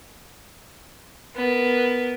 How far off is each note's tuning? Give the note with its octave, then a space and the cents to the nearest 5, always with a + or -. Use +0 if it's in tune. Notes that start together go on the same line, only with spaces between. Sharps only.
B3 +0 A#4 +0